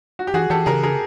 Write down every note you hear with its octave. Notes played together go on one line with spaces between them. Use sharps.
F#4
G4
E3 F#4 G#4
E3 G4 A4
C#3 G#4 A#4
G#4 A#4